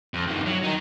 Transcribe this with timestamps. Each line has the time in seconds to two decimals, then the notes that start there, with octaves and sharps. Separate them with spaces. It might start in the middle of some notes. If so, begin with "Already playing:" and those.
0.14 F2
0.27 G2 D#3
0.46 F#3
0.64 D#4 A#4